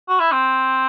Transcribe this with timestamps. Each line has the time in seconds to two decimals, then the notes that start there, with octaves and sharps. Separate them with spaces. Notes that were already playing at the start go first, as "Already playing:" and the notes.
0.09 F#4
0.20 E4
0.32 C4